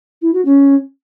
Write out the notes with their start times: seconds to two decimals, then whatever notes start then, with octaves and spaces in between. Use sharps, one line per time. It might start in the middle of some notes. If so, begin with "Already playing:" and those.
0.22 E4
0.33 F#4
0.45 C#4